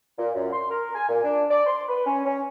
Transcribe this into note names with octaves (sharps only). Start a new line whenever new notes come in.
A#2
F#2
C6
A#4
G#5
A#2
D4
D5
C6
B4
C#4
C#4